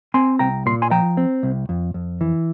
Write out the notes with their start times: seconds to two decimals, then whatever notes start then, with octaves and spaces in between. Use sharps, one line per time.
0.14 C4 G#5 C6
0.39 C2 G5 A#5
0.66 A#2 C6
0.82 G#5 C6
0.91 F3 G5 A#5
1.17 C4
1.43 C2
1.69 F2
1.94 F2
2.21 E3